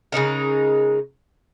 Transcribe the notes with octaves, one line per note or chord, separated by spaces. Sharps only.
C#3 G#3 D#4 A#4